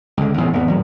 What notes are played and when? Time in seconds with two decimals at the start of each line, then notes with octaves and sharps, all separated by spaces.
0.17 C#2 D3
0.37 A1 E2 A2 C3
0.53 G#1 E2 B3
0.67 G#1 D#2 A2 F#3